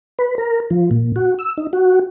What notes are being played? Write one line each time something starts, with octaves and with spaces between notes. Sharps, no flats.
B4
A#4
F3
A#2
F#4
E6
D#4
F#4